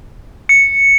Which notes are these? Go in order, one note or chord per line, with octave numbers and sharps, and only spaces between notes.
C#7